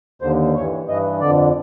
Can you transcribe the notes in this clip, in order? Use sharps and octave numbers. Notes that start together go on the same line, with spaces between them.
D#2 D3 C5
G2 E3 C#5
G2 E3 D#5
F2 D3 D5